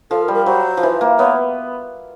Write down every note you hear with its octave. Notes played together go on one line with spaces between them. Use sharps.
F3 A4
A#4
G3
A#4
F#3 C5
F3
E3
A#3
B3 C#5